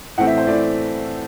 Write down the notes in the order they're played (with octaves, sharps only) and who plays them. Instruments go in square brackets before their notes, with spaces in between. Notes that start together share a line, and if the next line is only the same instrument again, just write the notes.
[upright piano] A2 E3 A3 C4 F#5
E5
C5
A2 E3 A3 C4 D5